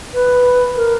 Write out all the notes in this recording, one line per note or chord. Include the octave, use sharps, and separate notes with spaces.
B4
A#4